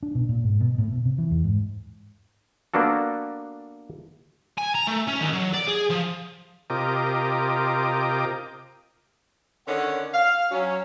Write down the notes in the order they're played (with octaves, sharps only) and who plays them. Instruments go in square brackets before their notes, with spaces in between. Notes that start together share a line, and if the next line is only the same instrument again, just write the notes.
[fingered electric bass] D4
B2
A#2
G#2
B2
A2
B2
C3
E3
E2
G#2
[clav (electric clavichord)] A#3 B3 D4 F#4 A4
[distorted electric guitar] G#5
A#5
A3
C#4
D#2
F#3
D5
G#4
F3
[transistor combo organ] C3 F4 G4 A#4 D#5 D6
[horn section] D3 D#3 C#4 C#5 D5 F#5
F5
F#3 C#4